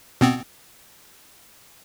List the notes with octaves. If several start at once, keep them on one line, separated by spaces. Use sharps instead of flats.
B2 B3 C4